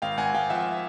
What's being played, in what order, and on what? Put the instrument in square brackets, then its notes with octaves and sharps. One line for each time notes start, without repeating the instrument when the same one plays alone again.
[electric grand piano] G#1 F5 G5
G#1 F#5 G#5
G#1 F5 G5
F3 E5 F#5